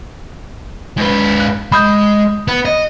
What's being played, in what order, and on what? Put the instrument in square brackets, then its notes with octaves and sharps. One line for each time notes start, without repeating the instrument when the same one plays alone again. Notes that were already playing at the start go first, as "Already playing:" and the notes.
[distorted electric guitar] G#2 B4
[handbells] F#6
[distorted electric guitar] G#3 [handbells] B5 D#6 G6
[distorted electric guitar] B3
D#5